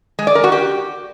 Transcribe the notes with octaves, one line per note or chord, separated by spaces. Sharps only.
G#3
D5
A#4
F#4
G4